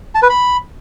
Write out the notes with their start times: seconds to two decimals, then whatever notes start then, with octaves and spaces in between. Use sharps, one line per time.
0.15 A5
0.22 B4
0.30 B5